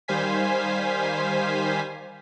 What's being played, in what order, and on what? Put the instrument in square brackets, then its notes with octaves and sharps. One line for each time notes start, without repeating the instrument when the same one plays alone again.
[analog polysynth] D#3 G3 C5 F5 G#5 B6